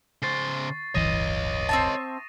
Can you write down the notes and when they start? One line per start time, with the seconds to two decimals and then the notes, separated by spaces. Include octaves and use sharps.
0.22 C#3 C5 C#6 A6 C7
0.95 D1 G1 E3 C#5 D#5 D#6 A#6 D#7
1.69 C4 E5 A5